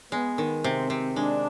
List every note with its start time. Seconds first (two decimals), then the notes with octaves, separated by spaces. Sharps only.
0.12 G#3 B3
0.38 D#3
0.64 C3 C4
0.90 C3
1.16 G#3 D4